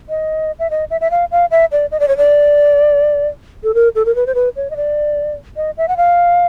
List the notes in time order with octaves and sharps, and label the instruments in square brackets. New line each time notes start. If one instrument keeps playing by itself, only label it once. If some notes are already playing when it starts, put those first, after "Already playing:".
[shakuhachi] D#5
E5
D#5
E5
E5
F5
F5
E5
D5
D#5
D5
C#5
D5
A4
A#4
A4
A#4
B4
C5
B4
C#5
D#5
D5
D#5
E5
F#5
F5